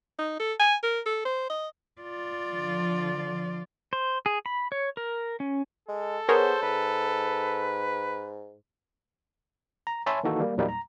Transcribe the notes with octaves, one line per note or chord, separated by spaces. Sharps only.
D#4
A4
G#5
A#4
A4
C5
D#5
F4 D5
D3 F3
C5
G#4
B5
C#5
A#4
C#4
G#3 A4
B3 G#4 A#4 C5 C#5
G#2 B4
A#5
C#5 E5 G#5 A5 B5 C6
D#3 E3 A#3 D#4 F#4 A4
G3 A#3
E2 A#2 F#3 G3 A#3 D#4
A#5